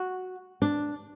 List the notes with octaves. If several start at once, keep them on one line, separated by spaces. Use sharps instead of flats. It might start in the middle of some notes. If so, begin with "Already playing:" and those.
Already playing: F#4
D4